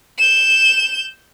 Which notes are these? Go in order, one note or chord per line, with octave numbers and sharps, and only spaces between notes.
G6 E7